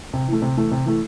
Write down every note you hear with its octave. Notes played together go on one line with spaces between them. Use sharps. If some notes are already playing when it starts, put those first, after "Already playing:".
C3
E3 A3
C3
E3 A3
C3
E3 A3